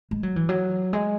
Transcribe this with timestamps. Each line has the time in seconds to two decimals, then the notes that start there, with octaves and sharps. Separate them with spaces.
0.11 G#3
0.23 F#3
0.36 E3
0.49 F#3
0.93 G#3